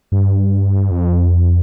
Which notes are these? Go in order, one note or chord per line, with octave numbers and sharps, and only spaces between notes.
G2
F2